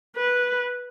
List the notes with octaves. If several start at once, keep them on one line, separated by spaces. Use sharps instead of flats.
B4